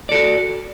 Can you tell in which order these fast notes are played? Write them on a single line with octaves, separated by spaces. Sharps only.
D5 A4 F#4